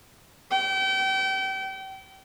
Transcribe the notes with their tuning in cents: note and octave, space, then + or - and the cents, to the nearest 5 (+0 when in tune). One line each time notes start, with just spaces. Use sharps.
G5 -35